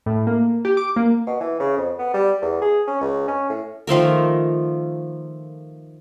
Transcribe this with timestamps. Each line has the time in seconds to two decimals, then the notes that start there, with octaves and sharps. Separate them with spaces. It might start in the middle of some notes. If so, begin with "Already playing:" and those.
0.06 A2
0.27 A#3
0.65 G4
0.77 D6
0.96 A#3
1.27 B2
1.40 E3
1.60 C#3
1.77 F2
1.99 B3
2.14 G3
2.42 E2
2.62 G#4
2.88 C#4
3.01 C#2
3.28 C#4
3.50 A2
3.87 D#3 F3 A3 A#4